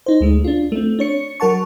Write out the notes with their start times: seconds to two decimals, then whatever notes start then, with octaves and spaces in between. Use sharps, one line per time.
0.06 D#4 C5
0.21 D2 G#3 A3
0.44 D4 F4
0.72 A3 C4
0.99 D4 C#5 C#7
1.40 F#3 A#4 F#5 A5 C#6